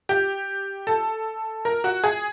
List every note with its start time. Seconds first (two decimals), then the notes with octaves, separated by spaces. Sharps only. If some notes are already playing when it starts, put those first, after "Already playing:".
0.09 G4
0.87 A4
1.65 A#4
1.84 F#4
2.04 G#4